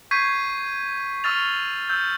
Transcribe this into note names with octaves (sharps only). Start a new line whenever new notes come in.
C#6 G6 G#6 B6 C7 D#7
C#6 E6 F6 A6 F7
E6 G6